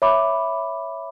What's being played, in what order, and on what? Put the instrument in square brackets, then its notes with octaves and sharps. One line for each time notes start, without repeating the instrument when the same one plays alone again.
[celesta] C#5 E5 B5 D6